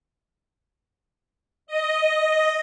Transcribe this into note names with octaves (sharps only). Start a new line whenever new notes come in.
D#5